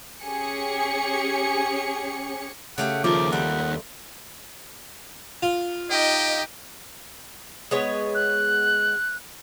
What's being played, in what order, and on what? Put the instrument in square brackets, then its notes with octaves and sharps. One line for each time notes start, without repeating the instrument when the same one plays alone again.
[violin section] C#4 G4 G#4 C#7
[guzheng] C#3 A3 G4 [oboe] F#5
[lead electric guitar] D#2 A#4 [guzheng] F3 [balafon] F4 [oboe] D6
[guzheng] G3 C4 [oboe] F#5
[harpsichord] F4
[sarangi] D#4 [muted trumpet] G4 [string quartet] D#5 G5
[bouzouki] G#3 B3 C#5
[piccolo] F#6